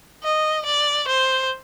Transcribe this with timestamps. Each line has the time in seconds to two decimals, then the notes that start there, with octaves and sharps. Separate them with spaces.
0.23 D#5
0.66 D5
1.08 C5